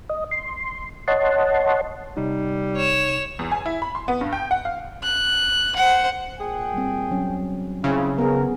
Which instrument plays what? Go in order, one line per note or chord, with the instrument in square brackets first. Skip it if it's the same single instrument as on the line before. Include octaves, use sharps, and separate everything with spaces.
[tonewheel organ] D#5
C6
C#5 D#5 F#5 A5 C6
[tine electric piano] C3 D#4 [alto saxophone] G3
[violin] C#5 E7
[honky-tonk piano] E2
G#5
E4
B5
C6
B3
G2
G5
F#5
F5
[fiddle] F#6
C5 F#5
[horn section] A#2 G#4 G5
[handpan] G3 C4
F#3 C#4
[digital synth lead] C#3 [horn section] C4 E4 F4
[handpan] B3 G#4 [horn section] A#4